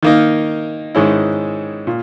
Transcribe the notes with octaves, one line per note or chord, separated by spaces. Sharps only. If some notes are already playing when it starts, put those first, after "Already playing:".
D#3 A#3 D#4
G#2 D#3 G#3 C#4 E4
A#2